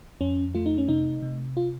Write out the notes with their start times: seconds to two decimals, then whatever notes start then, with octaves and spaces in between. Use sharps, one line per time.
0.21 F2 C#4
0.55 A3 F4
0.66 D#4
0.78 C#4
0.88 C3 D#4
1.22 C3
1.57 F4